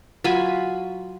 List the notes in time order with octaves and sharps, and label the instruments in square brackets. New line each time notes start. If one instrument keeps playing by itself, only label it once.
[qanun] F#3 F4 G#5 B5